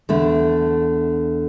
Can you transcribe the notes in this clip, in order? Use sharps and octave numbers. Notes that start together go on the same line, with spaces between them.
E2 D3 A3